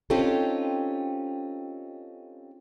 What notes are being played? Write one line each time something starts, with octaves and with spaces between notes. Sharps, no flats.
C4 C#4 D#4 F4 G4 A4